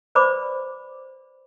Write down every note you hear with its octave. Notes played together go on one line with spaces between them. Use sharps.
B4 C5 D5 B5 D6